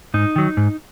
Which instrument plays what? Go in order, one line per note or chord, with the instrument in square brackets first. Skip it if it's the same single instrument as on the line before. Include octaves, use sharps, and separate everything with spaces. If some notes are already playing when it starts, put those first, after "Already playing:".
[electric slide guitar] G#2 D#4
D#3 F#3
G#2